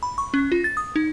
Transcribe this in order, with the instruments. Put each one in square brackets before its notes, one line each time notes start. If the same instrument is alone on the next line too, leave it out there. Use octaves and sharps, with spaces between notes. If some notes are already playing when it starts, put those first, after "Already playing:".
[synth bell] B5
C#6
C#4
F4
A6
D#6
D#4